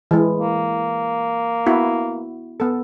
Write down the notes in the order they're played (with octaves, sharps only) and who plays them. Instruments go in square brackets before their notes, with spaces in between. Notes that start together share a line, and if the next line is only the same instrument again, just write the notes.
[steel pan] E3 G#3
[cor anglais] A#3
[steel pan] B3 E4 F#4
B3 A4